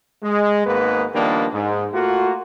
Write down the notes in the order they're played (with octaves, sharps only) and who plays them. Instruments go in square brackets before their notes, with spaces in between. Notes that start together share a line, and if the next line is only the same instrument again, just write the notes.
[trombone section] G#3
G#1 G#2 G#3 A#3 B3 B4
D#3 F3 G3 A#3 B3 D4
G#2
A3 A#3 F4 F#4